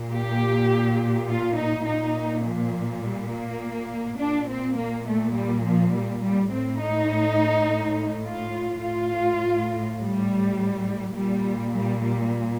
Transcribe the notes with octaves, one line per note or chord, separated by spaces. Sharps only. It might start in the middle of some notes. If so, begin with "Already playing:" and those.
Already playing: A#2
G4
F4
D#4
A#2 D#4
F3
G3
A#3
A#2 D4
C4
A#3
A3
G3
F3
G3
G3
A2 C4
D#4
F4
A2 F4
G3
A#2 G3
G3
G3